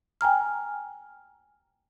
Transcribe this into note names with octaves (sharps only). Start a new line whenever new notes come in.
G5 G#5 A#5 F6